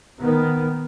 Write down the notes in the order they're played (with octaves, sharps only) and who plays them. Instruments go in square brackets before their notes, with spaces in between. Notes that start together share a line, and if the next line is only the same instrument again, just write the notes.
[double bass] D#3 B3